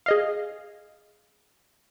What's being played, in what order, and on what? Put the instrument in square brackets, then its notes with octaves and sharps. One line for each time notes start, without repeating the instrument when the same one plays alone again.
[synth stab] G#4 D#5 F5